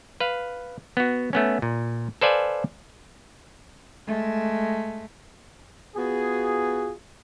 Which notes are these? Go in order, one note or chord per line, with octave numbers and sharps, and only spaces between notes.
B4 F5
B3 F#4
A3 B3 C#4
A#2
A4 B4 C5 D5 F5 G#5
G#3 A3
B3 F4 F#4 G#4